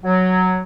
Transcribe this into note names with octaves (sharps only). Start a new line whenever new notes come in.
F#3